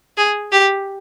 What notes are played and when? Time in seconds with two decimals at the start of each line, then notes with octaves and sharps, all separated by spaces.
0.17 G#4
0.52 G4